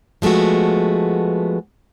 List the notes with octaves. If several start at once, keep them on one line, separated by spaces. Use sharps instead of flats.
F3 G#3 A3 B3 F#4